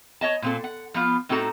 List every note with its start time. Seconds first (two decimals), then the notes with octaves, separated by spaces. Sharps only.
0.21 C#5 D#5 A5
0.42 A#2 C4 A4
0.64 F#5
0.94 F3 B3 F4
1.29 A2 C4 D#4 F#4 A4 A#5